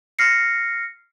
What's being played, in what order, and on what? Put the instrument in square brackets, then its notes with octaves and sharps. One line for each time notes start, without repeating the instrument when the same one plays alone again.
[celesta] F6 A#6 C7 C#7